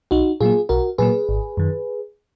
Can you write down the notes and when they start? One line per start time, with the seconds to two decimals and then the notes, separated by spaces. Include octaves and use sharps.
0.11 B1 D#4 F#4
0.41 A#2 F#3 A#3 F4 G#4
0.69 B1 F#4 A#4
0.98 A#2 F#3 A#3 G#4 B4
1.29 G#1
1.57 F#2 D#3